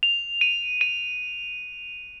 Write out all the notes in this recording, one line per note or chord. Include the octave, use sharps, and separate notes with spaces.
F7
D#7
D#7